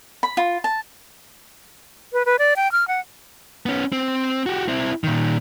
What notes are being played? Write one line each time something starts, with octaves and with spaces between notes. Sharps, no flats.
B5
F4
A5
B4
B4
D5
G5
F6
F#5
B3 C#4
C4
F#4 G4
C4 E4
A#2 D#3